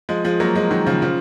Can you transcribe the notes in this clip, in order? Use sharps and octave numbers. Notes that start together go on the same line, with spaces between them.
F3 G#3
F3 G#3
F#3 A#3
F3 G#3
D#3 F#3
C#3 F3
C#3 F3